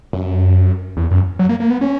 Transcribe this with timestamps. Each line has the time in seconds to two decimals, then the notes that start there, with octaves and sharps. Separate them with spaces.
0.13 F#2
0.97 E2
1.11 F#2
1.39 F#3
1.49 A#3
1.60 A#3
1.70 B3
1.81 C#4